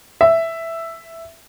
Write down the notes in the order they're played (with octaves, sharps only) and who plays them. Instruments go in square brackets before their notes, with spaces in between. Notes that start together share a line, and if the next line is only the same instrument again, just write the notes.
[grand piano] E5